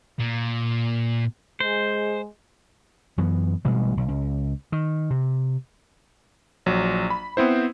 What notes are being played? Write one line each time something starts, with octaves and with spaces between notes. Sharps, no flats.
A#2
G#3 C5
F#2 E3 B3
A1 B2 G3 G#3
B1
C#2
D#3
C3
A#1 F#3
B5
B3 C4 E4 C5